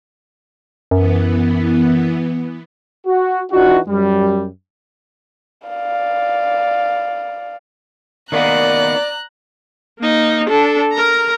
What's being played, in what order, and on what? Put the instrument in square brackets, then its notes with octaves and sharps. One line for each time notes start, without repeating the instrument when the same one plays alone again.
[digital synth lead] F#2 [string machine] E3 B3
[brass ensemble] F#4
E3 D4 D#4 F4 F#4
F#2 G3
[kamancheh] D5 F5
[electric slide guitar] D#3 A#3 B3 [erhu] D5 [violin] A#5 F#6
[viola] A#3 D#4
D4 A4
A#4 A#5